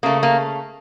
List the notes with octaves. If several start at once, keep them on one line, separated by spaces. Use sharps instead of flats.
C#3 A3 A#3
A#3